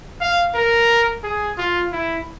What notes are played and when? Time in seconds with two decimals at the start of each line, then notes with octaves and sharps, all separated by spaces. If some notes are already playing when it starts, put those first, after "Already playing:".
0.21 F5
0.55 A#4
1.24 G#4
1.58 F4
1.92 E4